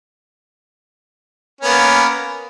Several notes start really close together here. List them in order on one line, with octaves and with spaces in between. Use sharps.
C#4 B3 A#3